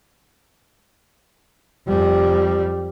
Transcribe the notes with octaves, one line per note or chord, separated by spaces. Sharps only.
F2 G3